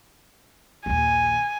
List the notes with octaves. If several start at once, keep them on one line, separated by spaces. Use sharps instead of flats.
A#1 D#2 G#5